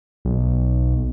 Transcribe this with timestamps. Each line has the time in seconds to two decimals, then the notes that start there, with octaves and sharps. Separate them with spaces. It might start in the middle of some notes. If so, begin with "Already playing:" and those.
0.25 B1